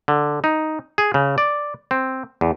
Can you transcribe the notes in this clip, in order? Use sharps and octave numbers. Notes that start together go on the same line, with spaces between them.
D3
D#4
G#4
C#3
D5
C4
E2